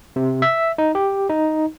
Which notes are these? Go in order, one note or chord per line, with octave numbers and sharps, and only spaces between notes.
C3
E5
D#4
G4
D#4